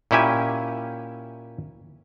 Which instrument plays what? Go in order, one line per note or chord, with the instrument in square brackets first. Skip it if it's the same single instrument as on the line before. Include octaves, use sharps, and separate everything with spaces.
[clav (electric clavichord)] A#2 C#4 E4 G4 G#5